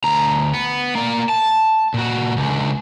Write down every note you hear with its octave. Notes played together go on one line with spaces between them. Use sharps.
D2 A#5
B3
A#3 D5
A5
A#2 F#4
C#2 D3